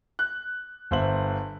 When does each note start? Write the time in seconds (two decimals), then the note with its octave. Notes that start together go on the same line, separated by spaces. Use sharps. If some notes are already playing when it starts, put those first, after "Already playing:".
0.19 F#6
0.91 G1 C5 E5 F#7